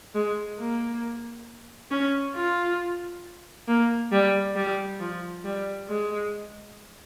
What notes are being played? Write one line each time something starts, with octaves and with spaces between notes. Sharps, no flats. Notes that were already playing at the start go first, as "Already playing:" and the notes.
G#3
A#3
C#4
F4
A#3
G3
G3
F3
G3
G#3